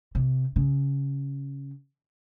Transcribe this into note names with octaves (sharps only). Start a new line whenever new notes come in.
C3
C#3